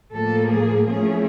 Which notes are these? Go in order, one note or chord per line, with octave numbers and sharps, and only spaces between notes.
A2 F3 A#3 A4
G#4
F3 A3 C#4 E4 G#4